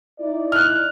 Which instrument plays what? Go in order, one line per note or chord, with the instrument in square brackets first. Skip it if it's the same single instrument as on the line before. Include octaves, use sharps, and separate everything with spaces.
[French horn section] D#4 E4 D5
[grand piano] F6 F#6